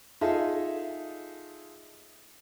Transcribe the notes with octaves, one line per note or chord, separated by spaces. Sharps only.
D#4 F4 G#4 A4 D#5 E5